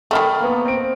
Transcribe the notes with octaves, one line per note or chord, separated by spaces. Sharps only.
D#3 G3 A3 A5 B5 F6
A#3 B3
C4 D7